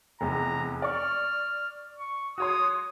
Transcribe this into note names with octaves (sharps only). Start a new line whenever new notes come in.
F1 E2 A#5
D5 C#6 F6
C#6
F#4 C#5 C6 D#6